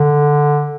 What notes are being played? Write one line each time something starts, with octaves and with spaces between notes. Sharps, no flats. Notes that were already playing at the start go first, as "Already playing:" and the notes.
Already playing: D3